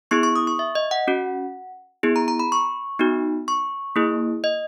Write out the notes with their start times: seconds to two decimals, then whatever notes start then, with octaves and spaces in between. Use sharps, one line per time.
0.11 B3 E4 G#4 C#6
0.23 C#6
0.36 D#6
0.47 C#6
0.59 E5
0.75 D#5
0.91 F#5
1.08 C#4 F#4
2.03 B3 E4 G#4
2.16 A#5
2.28 A#5
2.39 B5
2.52 C#6
2.99 B3 D#4 F#4
3.48 C#6
3.96 A#3 E4 G#4
4.44 D#5